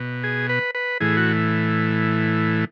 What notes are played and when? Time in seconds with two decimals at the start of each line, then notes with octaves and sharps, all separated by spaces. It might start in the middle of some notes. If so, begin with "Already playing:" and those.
Already playing: B2
0.24 G#4
0.49 B4
0.75 B4
1.00 A2 E3 G#4
1.17 F#4